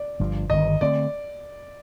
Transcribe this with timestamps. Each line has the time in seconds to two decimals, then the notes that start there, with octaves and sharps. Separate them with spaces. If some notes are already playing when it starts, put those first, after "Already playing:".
Already playing: D5
0.20 G1 G2 F3
0.50 G1 G2 D#3 D#5
0.81 D3 A3 C4 D5